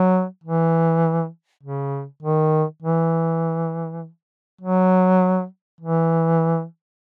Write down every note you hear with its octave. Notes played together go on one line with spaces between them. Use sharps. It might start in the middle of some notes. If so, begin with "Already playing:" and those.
Already playing: F#3
E3
C#3
D#3
E3
F#3
E3